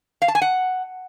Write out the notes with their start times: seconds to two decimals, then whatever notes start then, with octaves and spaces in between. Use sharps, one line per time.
0.22 F5
0.28 A5
0.35 G#5
0.42 F#5